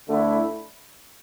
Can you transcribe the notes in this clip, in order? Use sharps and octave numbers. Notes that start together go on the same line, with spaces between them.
D2 D3 A3 E4